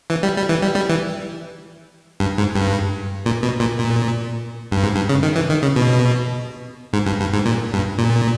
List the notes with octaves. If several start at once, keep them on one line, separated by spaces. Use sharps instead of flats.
E3
G3
G3
E3
G3
G3
E3
G2
G#2
G2
A#2
B2
A#2
A#2
G2
G#2
G2
C#3
D#3
E3
D#3
C#3
B2
G#2
G2
G2
G#2
A#2
G2
A#2